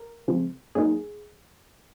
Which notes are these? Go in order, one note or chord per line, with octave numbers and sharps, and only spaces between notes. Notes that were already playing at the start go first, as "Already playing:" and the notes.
Already playing: A#4
C#3 F3 G#3 C4
G#2 F#3 A#3 D#4 G#4